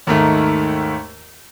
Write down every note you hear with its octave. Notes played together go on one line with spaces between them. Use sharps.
D#2 G#2 D#3 A3